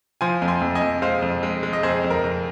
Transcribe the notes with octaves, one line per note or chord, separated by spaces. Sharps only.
F3 G#5 C6
F2
G#5 C6
F2
D#5 G#5
F2
G#3 C5 F5
F2
G#3
G#3
D#5
F2 G#4 C5
F2
A#4
F2